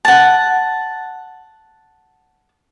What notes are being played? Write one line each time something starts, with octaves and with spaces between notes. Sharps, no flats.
F#5 A5